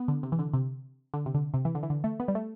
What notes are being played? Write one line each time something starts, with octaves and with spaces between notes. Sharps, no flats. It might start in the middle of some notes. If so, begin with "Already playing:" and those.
Already playing: B3
D3
C3
E3
D3
C3
D3
C3
D3
C3
E3
D3
E3
D3
A3
B3
G3
A3